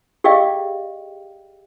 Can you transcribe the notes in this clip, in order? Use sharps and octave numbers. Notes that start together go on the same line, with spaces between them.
G4 G#4 D5 D#5 F5 G5